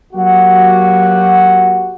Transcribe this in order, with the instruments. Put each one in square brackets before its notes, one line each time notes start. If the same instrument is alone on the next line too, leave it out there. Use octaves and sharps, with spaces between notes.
[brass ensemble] F#3 A#3 F#4 G4 F#5